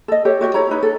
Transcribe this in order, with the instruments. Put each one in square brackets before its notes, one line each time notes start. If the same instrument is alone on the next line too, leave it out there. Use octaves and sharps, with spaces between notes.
[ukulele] A4 D#5
G4 A4 C#5
F#4 G4 D5 D#5
E4 C#5 A#5
D#4 E4 B4
A4